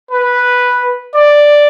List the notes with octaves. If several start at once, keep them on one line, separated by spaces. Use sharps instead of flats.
B4
D5